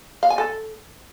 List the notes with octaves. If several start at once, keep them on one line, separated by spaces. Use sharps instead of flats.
F5
G#5
A4